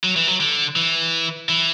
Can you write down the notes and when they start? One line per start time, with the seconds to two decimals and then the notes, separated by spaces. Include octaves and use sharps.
0.04 F#3
0.16 E3
0.27 F#3
0.40 D3
0.76 E3
1.49 E3